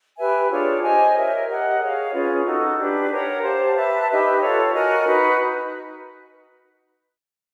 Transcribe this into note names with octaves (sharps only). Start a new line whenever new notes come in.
G4 B4 E5 G#5
D4 F4 G#4 C#5
G4 C5 D#5 G#5
A#4 C#5 E5
G4 A#4 D#5 F#5
G#4 C#5 F5
C#4 F4 G#4 B4
D#4 F#4 A4
D4 G4 B4
A#4 C#5 F#5
G4 C5 F5 A5
B4 E5 A5
D#4 G4 B4 E5
F4 A4 C#5 F5
F#4 A#4 D#5 G#5
D#4 F#4 B4